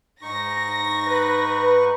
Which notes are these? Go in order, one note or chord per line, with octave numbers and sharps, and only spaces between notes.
G#2 D#4 C#6 A#6
B4